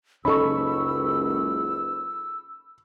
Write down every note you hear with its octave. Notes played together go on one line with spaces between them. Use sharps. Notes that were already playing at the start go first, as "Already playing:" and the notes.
F#1 C#2 C#4 D#4 A4 B5 C#6 E6